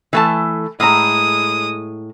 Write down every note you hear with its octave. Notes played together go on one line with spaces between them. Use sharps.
E3 A3 A5
A2 G#3 A#5 D#6